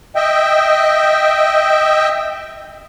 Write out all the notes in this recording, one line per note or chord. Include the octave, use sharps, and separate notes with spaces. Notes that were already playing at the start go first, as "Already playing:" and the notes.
D#5 E5 G5